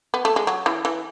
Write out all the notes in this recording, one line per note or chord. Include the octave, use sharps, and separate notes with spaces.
B3
A3
G#3
F#3
E3
E3